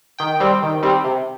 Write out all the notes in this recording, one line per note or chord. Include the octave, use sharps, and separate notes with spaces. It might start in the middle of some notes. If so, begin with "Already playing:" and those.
D#3 G5
G3 C4
D#3
G3 C4
C3